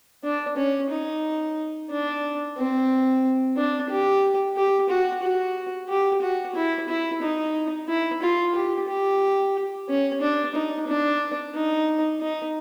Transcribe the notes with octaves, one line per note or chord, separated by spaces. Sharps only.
D4
C#4
D#4
D4
C4
D4
G4
G4
F#4
F#4
G4
F#4
E4
E4
D#4
E4
F4
G4
G4
C#4
D4
D#4
D4
D#4
D#4